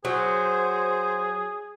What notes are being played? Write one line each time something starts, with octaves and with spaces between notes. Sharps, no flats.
F#3 G#4 C5